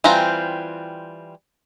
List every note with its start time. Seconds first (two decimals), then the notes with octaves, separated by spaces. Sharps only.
0.04 E3 G3 C4 F4 A#5